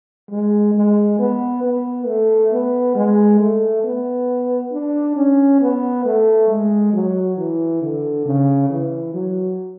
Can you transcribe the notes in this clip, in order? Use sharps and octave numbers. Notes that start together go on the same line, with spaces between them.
G#3
G#3
B3
B3
A3
B3
G#3
A3
B3
D4
C#4
B3
A3
G#3
F#3
E3
D3
C#3
E3
F#3